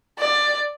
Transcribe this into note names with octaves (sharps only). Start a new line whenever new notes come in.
D5